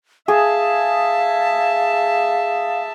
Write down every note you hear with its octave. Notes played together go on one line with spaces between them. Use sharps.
G#4 E5 F5 A5